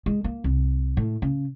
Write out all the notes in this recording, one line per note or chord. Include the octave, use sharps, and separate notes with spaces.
G#3
A#3
C2
A2
C#3